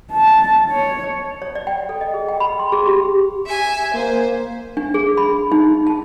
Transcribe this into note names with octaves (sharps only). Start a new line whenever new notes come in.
A5
C#5
C#5
D5
G5
A4
D#5
G#4
G5
B5
C6
G#4
G4
E5 G#5
A#3 C5
D4
G#4
B5
D#4
A5